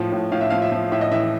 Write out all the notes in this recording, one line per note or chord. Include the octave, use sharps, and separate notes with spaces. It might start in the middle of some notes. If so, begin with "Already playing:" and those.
Already playing: A2 F3
A2
A2 F5
E5
F3 F5
E5
F3
A2 E5
D#5
E3 E5